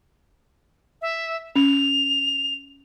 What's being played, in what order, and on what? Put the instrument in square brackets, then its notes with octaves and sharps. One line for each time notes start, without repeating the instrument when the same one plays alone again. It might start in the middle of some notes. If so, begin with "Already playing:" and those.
[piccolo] E5
[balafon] C#4 [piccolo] F7